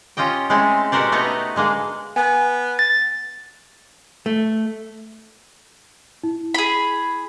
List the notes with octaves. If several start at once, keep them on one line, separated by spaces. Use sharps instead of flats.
C#4 F4 G4 D#5 G5
G#3 A3 C4 C#4 E4
B2 F#4 G4 A#4 C5 D5
A3 B3 D#4 C#5 D#5
D3 G#3 A#3 G#4
B3 G#5
A6
A3
E4
G#4 B5